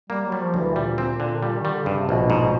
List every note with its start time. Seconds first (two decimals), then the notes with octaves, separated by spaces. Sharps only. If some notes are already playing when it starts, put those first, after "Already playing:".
0.10 G3 A#3
0.27 F#3
0.32 G3
0.43 F3
0.54 D2 E3
0.75 A#2 G3
0.98 C4
1.20 D3
1.43 G3
1.59 D#3
1.65 G3
1.71 D3
1.84 G2 C#3
1.96 C3
2.09 A#1 B2
2.30 G#2